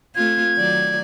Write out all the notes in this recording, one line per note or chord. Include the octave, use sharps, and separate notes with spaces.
A3 C4 F4 G#6
D#3 F#3 D5